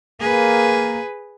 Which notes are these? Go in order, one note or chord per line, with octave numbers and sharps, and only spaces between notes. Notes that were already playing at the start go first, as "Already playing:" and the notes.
A#3 G#4 B4